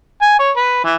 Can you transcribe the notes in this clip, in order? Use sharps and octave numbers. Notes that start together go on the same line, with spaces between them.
G#5
C#5
B4
E3